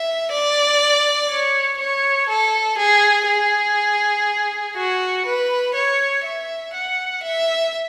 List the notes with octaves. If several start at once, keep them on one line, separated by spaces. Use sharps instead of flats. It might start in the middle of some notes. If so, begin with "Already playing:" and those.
Already playing: E5
D5
C#5
C#5
A4
G#4
G#4
F#4
B4
C#5
E5
F#5
E5